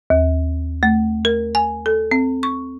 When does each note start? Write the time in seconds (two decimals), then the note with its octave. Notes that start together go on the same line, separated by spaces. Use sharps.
0.10 D#2
0.83 A3
1.25 A#4
1.55 G#5
1.86 A4
2.11 C4
2.43 C#6